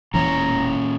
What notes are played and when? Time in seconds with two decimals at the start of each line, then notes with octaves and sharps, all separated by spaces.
0.14 E1 E2 A#2 E3 C#4 C#5 A#5